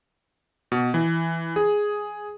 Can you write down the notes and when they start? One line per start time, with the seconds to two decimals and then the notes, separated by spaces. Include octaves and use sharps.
0.72 B2
0.94 E3
1.56 G#4